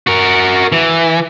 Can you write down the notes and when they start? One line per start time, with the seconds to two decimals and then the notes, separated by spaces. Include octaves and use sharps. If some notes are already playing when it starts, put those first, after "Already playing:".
0.07 F#4 A#4
0.72 E3